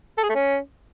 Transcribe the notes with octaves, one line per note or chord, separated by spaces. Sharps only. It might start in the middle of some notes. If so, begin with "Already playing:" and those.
A4
G#4
A3
C#4